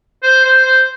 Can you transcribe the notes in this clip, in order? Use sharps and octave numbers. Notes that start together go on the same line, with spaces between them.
C5
C5
C5